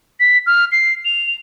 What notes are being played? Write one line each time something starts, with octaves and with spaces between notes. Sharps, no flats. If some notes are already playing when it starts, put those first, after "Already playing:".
B6
F6
C7
F7